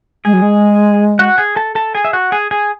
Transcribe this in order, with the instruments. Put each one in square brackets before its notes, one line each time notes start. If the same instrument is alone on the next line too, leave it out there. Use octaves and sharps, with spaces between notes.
[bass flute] G#3 [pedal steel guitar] G#4 G#5
[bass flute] F#3
G#3
[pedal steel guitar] F#4 F#5
G#4 G#5
A4 A5
A4 A5
G#4 G#5
E5
F#4 F#5
G#4 G#5
G#4 G#5